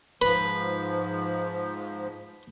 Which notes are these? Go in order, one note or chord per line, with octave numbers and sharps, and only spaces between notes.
G#2 F3 B4